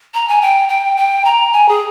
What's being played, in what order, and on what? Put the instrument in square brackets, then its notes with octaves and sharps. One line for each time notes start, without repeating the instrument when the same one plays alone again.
[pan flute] A#5
G#5
G5
G5
G5
A#5
G#5
G#4